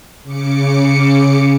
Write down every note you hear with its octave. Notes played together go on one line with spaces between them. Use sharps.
C#3 D6 C#7